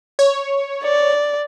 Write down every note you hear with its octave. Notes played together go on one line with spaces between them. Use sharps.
C#5
D5